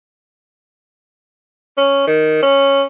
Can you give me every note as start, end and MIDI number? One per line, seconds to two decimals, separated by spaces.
1.78 2.06 61
2.07 2.40 51
2.43 2.84 61